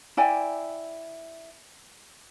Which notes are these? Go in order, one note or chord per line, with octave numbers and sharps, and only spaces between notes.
E4 D5 G5 G#5